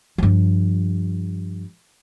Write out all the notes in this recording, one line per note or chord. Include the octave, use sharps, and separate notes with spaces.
G2 F3